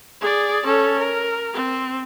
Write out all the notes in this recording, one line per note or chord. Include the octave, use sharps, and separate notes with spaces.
G#4 D5
C#4 A4
A#4
C4